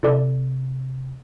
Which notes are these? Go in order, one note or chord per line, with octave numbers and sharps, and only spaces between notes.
C3 E4 A4 D5